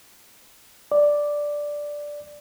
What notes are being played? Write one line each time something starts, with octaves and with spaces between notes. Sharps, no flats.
D5